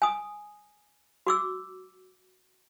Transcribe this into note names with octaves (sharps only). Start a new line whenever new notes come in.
G#5 D#6
F#4 D6 E6